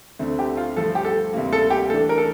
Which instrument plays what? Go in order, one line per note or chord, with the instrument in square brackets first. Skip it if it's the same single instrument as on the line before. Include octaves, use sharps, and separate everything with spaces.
[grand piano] D2 D3 A3 C4
[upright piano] G4
F4
[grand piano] G2 F3 A3 [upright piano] A4
[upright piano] G4
A4
[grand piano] D2 C3 G3 A#3
[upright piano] A4
G4
[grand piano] E3 A3 D4 [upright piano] A4
[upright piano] A#4
A4